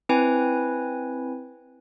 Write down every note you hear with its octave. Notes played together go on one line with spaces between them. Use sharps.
C4 E4 B4 G#5